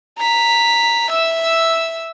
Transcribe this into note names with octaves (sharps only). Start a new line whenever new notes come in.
A#5 B6
E5 E6